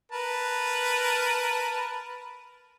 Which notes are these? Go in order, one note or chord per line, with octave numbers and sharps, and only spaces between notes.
A#4 B4 A5